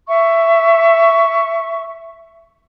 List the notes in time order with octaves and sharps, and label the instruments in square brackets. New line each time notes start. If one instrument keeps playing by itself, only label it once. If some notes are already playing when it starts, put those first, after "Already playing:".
[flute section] E5 C#6